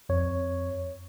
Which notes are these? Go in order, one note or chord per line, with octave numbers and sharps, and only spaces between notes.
F2 C#5